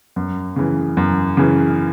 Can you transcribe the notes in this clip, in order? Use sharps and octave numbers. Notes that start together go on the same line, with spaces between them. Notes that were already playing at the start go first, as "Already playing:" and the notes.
F#2
C#3 E3
F#2
C#3 E3